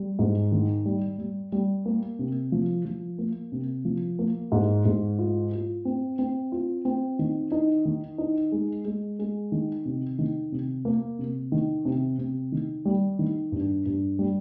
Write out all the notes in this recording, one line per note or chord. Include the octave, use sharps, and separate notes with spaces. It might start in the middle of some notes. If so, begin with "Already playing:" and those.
Already playing: G3
G#2
D#3
G3
G3
G3
A#3
C3
F3
F3
A#3
C3
F3
A#3
G#2
G#2
F4
F4
C4
C4
F4
C4
D#3
D#4
D#3
D#4
G#3
G#3
G#3
D#3
C3
D#3
C3
A#3
C3
D#3
C3
C3
D#3
G3
D#3
G2
G2
G3